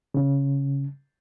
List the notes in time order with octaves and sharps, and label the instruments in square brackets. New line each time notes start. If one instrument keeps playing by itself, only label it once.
[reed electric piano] C#3